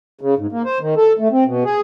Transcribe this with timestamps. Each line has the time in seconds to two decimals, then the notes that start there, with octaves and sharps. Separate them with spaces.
0.21 C#3
0.38 G#2
0.52 A#3
0.65 C5
0.80 D#3
0.97 A4
1.19 A3
1.32 C4
1.45 B2
1.64 G#4